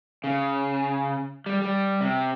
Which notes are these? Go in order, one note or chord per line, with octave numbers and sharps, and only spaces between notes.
C#3
G3
G3
C3